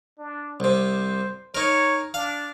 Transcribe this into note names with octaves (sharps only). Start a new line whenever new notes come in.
D4
C2 C3 C5
D#4 A#4 C#5
D4 F5